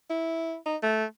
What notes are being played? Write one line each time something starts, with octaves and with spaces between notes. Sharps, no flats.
E4
D#4
A3